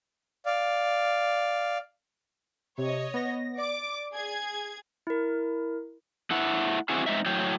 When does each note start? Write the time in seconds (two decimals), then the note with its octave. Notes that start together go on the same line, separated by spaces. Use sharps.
0.46 D5 F5
2.78 C3 C#5 D#5
3.14 B3 A#6
3.58 D5 D6
4.12 G#4 G#6
5.07 E4 A#4
6.31 A3 E4 F#5
6.89 C4 E4 F#4 G#4
7.06 G#3 C4 D#4 E5
7.26 A2 F#3 C#5 G5